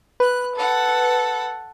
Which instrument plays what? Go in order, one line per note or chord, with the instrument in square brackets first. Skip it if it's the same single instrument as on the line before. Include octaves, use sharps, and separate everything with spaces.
[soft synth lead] B4 [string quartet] F#6
[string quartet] A4 F#5